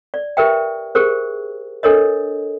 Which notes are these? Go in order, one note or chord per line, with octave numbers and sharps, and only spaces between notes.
D5
G4 A#4 B4 E5 G5
G4 G#4 A#4 C5
D4 A4 A#4 C#5 D#5